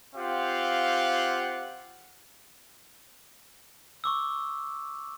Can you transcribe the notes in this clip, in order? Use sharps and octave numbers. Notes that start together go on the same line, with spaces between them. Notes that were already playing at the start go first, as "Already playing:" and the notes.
C4 F4 G4 F5 F#5
C#6 D6 E6